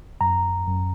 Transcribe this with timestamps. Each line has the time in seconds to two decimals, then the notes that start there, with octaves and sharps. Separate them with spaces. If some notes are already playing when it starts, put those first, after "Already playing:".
0.21 F#2 A#5
0.67 F#2